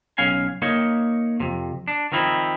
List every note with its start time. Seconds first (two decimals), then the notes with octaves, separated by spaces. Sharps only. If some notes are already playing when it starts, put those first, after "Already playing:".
0.18 B1 C#4 F5 G#5
0.62 A#3 D#4 C#5
1.40 F2 C3
1.88 D4
2.12 D#3 F3 C4 D#4 E4